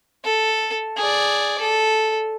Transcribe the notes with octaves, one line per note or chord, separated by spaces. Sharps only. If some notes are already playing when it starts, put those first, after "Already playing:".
A4
G#4 D5
A4